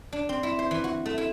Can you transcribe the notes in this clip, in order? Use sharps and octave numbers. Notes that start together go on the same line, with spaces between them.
D4
C4
E4
C5
E3
F#4
A3
E4